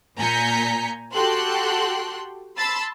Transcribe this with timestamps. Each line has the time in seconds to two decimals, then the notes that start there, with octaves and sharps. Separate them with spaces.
0.17 A#2 G#5 A#5 G6 B6 C#7
1.14 F#4 G4 A4 G5 C6 F#6
2.58 A5 B5 C6 E6 A6